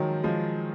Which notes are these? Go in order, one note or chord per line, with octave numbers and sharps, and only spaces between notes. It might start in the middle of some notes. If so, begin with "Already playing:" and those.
Already playing: D#3 F3 F#3 G#3
F3 G#3